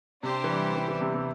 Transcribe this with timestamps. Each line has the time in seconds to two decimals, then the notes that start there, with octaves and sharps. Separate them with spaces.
0.23 C3 D4 G4 C5
0.44 E3
0.49 G3
0.75 E3
0.88 E3
1.01 C3
1.14 C3